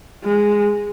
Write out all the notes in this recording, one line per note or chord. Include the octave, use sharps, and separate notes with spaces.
G#3